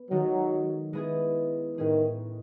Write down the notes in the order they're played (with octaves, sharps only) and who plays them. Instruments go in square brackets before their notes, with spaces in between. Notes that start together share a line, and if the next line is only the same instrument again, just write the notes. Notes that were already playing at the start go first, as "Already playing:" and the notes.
Already playing: [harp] B3
[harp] D#3 G#3 D#4 A4 [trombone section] F#3
[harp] G#3 B3 E4 G#4
[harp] A2 G#3 C#4 G#4 [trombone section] D#3